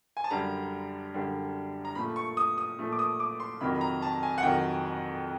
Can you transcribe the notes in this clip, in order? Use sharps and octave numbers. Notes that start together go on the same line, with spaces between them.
G#5
A5
F#2 D3 G3 A#5
F#2 D3 G3
A#5
A#2 F3 A3 B5
C#6
D#6
D#6
A#2 F3 A3
D6
D#6
D6
C6
F2 C3 D#3 F#3 B5
B5
A#5
A5
G#5
F#5
F2 C3 D#3 F#3 G5